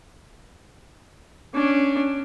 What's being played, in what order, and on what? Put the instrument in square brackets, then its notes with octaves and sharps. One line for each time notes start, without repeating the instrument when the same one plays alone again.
[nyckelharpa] C#4 D4